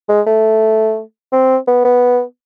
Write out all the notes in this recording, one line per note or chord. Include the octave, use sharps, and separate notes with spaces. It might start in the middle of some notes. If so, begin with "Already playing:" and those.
G#3
A3
C4
B3
B3